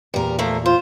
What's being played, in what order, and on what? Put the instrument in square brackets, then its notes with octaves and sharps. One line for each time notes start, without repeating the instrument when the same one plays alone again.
[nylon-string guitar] E2 A#2 [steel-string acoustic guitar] G3 A#4
[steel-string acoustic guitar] F3 A3 A#3
[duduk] F4 [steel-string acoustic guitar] C5